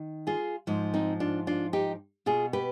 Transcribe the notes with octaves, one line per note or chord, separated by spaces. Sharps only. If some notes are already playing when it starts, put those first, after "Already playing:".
Already playing: D#3
F4 G#4
G#2 F3
C4 D#4
D4 F4
D4 F4
D#4 G4
B2 F4 G#4
G4 B4